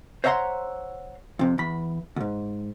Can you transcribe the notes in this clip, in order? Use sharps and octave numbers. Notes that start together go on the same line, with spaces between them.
C5 C#5 E5 F#5 A#5 C6
F2 C3
E2 B5
D2 G#2